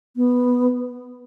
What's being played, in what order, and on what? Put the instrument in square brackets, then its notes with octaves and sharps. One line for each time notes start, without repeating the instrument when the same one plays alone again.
[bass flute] B3